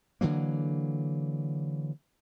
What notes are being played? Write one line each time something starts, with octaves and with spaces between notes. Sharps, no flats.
D3 E3 F#3 A#3